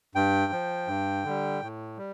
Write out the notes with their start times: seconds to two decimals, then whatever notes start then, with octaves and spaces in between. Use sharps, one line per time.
0.15 G2 G5
0.52 F3
0.88 G2
1.24 D3 G3
1.62 A2
1.97 G3